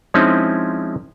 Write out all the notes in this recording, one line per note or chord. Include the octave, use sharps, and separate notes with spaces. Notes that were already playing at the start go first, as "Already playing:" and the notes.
F3 G#3 C4 C#4 D#4 E4